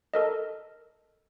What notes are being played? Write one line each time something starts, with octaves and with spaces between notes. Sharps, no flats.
A4 A#4 D#5